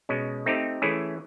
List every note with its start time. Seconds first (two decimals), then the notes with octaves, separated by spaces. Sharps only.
0.09 B2 G#3 C#4
0.46 A3 C4 D#4 G4
0.82 E3 A3 C#4 E4 G#4